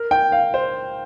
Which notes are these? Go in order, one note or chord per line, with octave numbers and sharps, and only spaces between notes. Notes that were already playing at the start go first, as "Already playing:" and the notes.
Already playing: A#4
G5
F5
C5